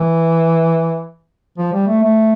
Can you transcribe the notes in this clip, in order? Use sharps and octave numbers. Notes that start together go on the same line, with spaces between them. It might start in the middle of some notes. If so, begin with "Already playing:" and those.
Already playing: E3
F3
G3
A3
A3